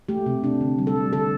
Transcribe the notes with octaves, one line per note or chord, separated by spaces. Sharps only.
A3 G4
C3
C3 D4
D3
G3
A4
G3
D3 A4